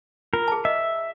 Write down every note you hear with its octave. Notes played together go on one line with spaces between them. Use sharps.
F4 A#4
G#4 A5
D#5 E5